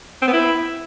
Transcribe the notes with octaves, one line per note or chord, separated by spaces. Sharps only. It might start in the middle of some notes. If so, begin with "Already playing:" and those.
C4
B3
E4